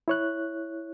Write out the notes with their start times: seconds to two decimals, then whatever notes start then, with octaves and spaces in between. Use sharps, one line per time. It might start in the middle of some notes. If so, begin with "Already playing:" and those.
0.08 E4 C#5 F#6